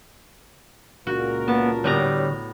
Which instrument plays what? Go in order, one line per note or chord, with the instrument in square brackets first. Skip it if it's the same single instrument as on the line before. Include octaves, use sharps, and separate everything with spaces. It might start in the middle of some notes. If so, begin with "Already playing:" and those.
[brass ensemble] C#2 A#2 A#4 [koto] F#4
[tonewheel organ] A#3 [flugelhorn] B3 [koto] A5
[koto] A2 B3 A#5 [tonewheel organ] D3 C#5 [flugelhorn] G3